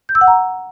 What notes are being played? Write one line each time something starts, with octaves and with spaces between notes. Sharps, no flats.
G6
E6
F#5
A#5